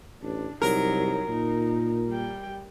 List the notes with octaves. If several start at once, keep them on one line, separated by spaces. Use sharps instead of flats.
A1 D4
C2 F#3 D#4 A#4
A#2 D#4
G3 G5